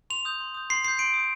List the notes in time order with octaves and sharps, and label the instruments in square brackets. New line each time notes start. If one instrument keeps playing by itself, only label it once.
[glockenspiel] C6 F7
D#6 G6
C6
D#6 G6
C6 C7
D#6 G6 C7
C6 D7
D#6 G6